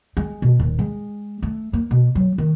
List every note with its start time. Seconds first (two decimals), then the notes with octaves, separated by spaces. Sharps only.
0.17 G#3
0.42 B2
0.60 D#1
0.79 G#3
1.42 A3
1.73 A#3
1.91 B2
2.15 F#3
2.38 D#3